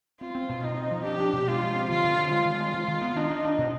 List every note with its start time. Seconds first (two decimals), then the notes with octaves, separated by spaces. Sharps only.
0.21 C4 F4
0.35 C4
0.49 B2
0.63 C4 D#4
0.77 C4
0.91 F3
1.05 D4 G4
1.20 D4
1.33 B2
1.47 G#3 F4
1.61 F3
1.75 C4
1.90 D3 F4
2.04 D3
2.18 C4
2.31 G#3 F4
2.45 D#3
2.60 G#3
2.74 D#3
2.88 D#3
3.01 B3
3.16 D4 D#4
3.30 D4
3.45 D4
3.58 B2